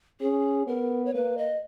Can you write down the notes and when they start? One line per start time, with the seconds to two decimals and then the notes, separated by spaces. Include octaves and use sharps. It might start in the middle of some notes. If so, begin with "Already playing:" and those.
0.20 C#4 G#4
0.67 B3 A#4
1.05 C#5
1.14 A#3 B4
1.38 D#5